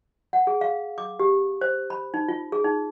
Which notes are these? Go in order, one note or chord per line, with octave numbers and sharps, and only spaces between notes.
F#5
G#4
F5
D6
G4
C5
B5
D#4
F4
G#4
D#4